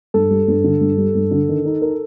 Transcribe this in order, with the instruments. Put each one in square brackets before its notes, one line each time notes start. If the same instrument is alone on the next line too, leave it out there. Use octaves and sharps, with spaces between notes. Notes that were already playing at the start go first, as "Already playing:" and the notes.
[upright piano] G2 [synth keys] A4
[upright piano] G3
G2
D3
G2
G3
G2
D3
D#3
D#4
A#4